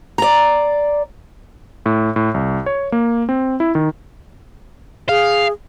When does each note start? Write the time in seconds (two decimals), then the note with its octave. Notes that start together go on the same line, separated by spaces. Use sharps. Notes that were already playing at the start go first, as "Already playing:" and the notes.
0.18 D5 A#5
1.86 A2
2.16 A2
2.34 C2
2.66 C#5
2.92 A#3
3.29 C4
3.60 E4
3.75 D#3
5.09 G#4 F5